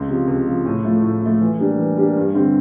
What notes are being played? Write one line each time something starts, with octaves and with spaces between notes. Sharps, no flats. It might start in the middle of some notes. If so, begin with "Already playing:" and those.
Already playing: C#2
C3 F3
C#2
C3 F3
A2
F3 A3
A2
F3 A3
E3
G3 A#3 D4
E3
G3 A#3 D4
G2
D3 G3 C4